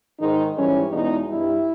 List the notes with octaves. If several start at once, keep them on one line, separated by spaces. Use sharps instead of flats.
G#2 D#3 G#3 D#4
G#2 E3 G3 C#4
E2 B2 G#3 D#4
G2 G3 E4